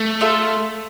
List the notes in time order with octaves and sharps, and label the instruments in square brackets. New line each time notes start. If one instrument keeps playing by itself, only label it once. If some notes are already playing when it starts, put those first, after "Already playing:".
Already playing: [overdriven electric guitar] A3
[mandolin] F4 A4 E5